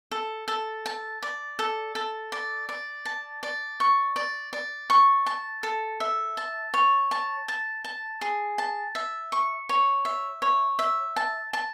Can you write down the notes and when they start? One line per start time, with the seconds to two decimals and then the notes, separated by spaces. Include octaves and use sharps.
0.11 A4
0.48 A4
0.86 A5
1.22 D5
1.59 A4
1.95 A4
2.32 D5
2.69 D5
3.05 A5
3.43 D5
3.80 C#6
4.16 D5
4.53 D5
4.90 C#6
5.26 A5
5.63 A4
6.00 E5
6.37 A5
6.74 C#5
7.11 A5
7.48 A5
7.84 A5
8.21 G#4
8.58 A5
8.95 E5
9.32 C#6
9.69 C#5
10.05 E5
10.42 C#5
10.79 E5
11.16 A5
11.53 A5